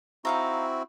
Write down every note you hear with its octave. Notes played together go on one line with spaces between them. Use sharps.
C4 D#4 E4 F#4 F5 A#5